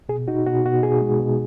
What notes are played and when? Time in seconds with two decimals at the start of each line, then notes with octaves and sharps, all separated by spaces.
0.09 B2 G#4
0.28 D#4 F#4
0.46 B2 F#4
0.65 B2 F#4
0.83 B2 G#4
1.02 G#3
1.20 B2